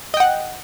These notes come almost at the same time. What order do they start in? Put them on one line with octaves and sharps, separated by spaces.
D#5 G5 F#5